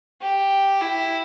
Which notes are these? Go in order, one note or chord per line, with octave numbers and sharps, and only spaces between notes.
G4
E4